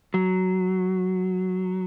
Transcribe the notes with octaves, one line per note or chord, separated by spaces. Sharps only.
F#3